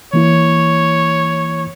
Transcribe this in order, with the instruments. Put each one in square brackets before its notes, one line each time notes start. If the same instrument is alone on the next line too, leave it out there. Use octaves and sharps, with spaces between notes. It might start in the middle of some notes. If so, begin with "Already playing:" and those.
[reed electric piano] E3 A#3 E4 [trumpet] C#5